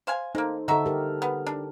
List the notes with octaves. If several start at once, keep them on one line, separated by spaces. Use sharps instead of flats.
C5 F5 G#5
G#3 A#3 D#4 A4 C5
D3 D#4 F#4 A4 E5
G4 A#4
B3
D4